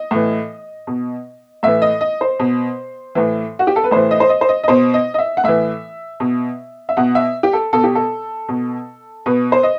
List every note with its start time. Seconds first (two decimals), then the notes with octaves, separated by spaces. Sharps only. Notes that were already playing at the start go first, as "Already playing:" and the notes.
Already playing: D#5
0.11 A2 E3
0.87 B2
1.63 A2 E3 E5
1.82 D#5
2.01 D#5
2.21 C5
2.39 B2
3.15 A2 E3
3.59 F#4
3.67 G4
3.76 A4
3.84 B4
3.91 A2 E3 C5
4.11 D#5
4.20 C5
4.29 D#5
4.41 C5
4.49 D#5
4.63 D#5
4.68 B2 C5
4.94 D#5
5.14 D#5
5.18 E5
5.37 F#5
5.44 A2 E3 E5
6.20 B2
6.89 E5
6.97 B2 F#5
7.15 E5
7.43 G4
7.53 A4
7.73 B2 A4
7.84 G4
7.95 A4
8.49 B2
9.26 B2 B4
9.52 C5
9.63 D#5